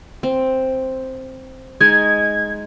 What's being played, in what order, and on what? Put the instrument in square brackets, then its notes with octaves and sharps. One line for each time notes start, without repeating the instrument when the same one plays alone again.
[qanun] C4
[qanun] G#3 D#4 [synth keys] G#6